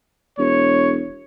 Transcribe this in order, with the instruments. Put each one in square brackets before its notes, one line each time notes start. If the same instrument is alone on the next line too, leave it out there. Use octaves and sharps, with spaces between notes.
[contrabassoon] E1 [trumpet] C#5